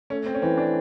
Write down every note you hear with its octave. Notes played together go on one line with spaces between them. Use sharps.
A3 C#4
C4
C#4
E3 C4
D4